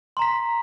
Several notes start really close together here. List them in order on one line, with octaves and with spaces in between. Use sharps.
C6 A#5 B6